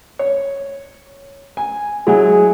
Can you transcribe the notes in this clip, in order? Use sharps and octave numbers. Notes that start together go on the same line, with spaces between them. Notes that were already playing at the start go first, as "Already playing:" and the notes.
C#5
G#5
F#3 G#3 E4 G#4 G#5